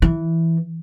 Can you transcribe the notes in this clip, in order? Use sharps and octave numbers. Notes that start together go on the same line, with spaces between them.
E3